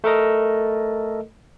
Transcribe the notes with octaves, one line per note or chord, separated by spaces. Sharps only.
A3 A4 A#4 D#5